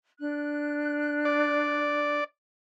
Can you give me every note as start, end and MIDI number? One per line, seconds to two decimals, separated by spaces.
0.20 2.19 62
0.20 2.19 90
1.25 2.24 74